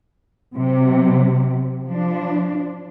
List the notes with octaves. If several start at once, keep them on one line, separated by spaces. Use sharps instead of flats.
C3 F#3
F3 D4